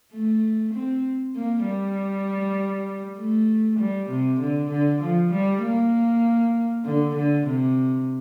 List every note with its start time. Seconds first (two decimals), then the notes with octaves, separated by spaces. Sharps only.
0.13 A3
0.74 C4
1.36 A#3
1.65 G3
3.18 A3
3.79 G3
4.10 C3
4.40 D3
4.70 D3
5.02 F3
5.32 G3
5.63 A#3
6.85 D3
7.15 D3
7.46 C3